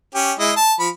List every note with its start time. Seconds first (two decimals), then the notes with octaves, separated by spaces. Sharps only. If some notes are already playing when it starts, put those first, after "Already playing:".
0.15 C#4 G4
0.39 G#3 E4 D#5
0.56 A5
0.79 F3 B5